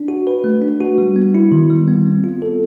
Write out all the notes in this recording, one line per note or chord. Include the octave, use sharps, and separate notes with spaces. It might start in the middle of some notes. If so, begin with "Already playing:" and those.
Already playing: D4
F#4
B4
A3
D4
F#4
G3
B3
E4
D#3
G3
B3
C4
F4
A4